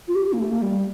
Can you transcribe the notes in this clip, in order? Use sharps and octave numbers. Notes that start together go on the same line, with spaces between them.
F4
G4
G4
A#3
A3
A#3
G3